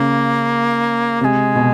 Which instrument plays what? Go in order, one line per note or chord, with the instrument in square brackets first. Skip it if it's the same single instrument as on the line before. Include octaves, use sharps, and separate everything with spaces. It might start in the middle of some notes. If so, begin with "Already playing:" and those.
Already playing: [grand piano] C#3 [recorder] A#3
[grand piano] C3 [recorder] A#3
[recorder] G#3
[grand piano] B2